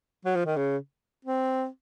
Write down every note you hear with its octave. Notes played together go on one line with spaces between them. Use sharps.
F#3
F3
D#3
C#3
C4